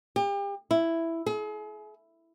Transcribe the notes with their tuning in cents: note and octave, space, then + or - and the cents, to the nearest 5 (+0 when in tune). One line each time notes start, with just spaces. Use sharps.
G4 +35
E4 +5
G#4 +40